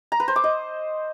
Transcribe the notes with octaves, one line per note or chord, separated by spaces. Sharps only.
A#5
B4
C5
D6
D#5